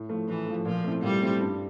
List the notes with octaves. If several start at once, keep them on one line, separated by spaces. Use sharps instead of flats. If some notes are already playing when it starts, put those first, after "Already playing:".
Already playing: A2
F3 A3
A2 E3
F3 A3
A#2 F3
A3 C4 E4
A#2 G3
A3 C4 E4
G2